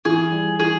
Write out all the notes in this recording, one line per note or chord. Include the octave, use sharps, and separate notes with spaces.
E3 G#4
G3
E3 G#4